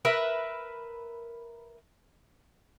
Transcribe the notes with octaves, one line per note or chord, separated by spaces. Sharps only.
A#4 B4 E5